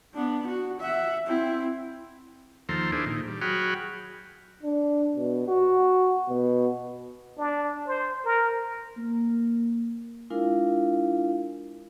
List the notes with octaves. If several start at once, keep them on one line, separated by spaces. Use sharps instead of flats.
B3 D4
F#4
E5 F#5
C4 E4
D#2 F3 A4 A#5 C6
D4 E4 G#4 A#4 C5
A#2 D#3
G3
F#3 F#4 G#4 G5 B5 F6
D4
B2
F#4
B2
D4
C5
A#4
A#3
G#3 D4 E4 F4 A#4 F5